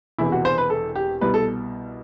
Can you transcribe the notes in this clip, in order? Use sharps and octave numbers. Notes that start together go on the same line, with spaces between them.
E1 E2 C3 E3 E4
F#4
C5
B4
A4
G4
C2 B2 G3 B4
A4